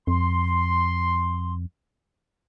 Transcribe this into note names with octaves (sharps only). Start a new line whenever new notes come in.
F2 C6